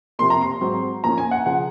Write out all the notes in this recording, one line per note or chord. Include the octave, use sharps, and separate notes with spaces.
C3 F3 A#3 C6
A#5
C6
G#2 F#3 C4
A#2 F3 A#3 C#4 A#5
G#5
F#5
C#3 F3 F#5